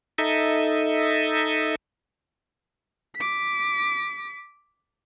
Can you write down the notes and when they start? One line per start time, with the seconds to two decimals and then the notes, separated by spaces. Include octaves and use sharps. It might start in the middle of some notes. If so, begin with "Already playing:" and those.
0.18 D#4 A4 D#5 E5
3.16 D6 B6